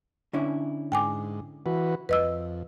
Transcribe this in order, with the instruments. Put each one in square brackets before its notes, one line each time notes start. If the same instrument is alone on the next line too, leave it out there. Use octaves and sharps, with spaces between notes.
[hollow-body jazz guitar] D3 C#4 E4
[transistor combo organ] G#2 [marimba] G5 G#5 D6
[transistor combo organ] E3 F#4 B4
[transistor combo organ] F2 [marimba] B4 D#5 E6